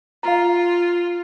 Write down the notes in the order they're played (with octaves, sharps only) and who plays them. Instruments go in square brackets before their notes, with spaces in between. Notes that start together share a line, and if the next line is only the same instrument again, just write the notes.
[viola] F4 [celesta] F5 A#5